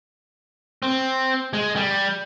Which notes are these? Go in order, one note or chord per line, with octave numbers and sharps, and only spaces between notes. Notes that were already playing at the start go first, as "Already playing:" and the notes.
C4
G#3
G3